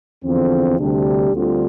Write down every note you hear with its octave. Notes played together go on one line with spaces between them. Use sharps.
E2 D3 F3 C4
D2 C3 G3 D4 G4
D2 D3 G3 C4 F4